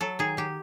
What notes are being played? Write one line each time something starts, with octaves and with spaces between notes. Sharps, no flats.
F#3 A4
D#3 G#4
D#3 G4